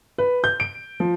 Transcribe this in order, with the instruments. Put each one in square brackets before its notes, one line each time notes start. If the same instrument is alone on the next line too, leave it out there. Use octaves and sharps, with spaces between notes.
[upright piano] B4
G6
D7
F3